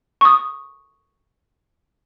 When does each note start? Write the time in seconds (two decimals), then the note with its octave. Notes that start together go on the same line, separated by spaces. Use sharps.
0.21 C#6 D#6